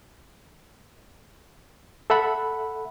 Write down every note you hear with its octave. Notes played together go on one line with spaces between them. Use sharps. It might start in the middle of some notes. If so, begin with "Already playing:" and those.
A4 E5 F#5 B5